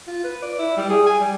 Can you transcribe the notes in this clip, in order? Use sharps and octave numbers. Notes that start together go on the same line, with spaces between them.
F4
B4
D5
E4
G3
G#4
G#5
G3